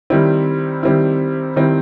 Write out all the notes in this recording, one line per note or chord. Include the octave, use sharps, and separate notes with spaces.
D#3 G3 C4 E4
D#3 G3 C4 E4
D#3 G3 C4 E4